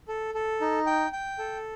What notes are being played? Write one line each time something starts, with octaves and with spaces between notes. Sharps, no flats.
A4
A4
D#4
G5
G5
A4